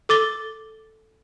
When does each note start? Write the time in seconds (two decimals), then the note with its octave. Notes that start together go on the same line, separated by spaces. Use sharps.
0.09 A4 D6 A6 G7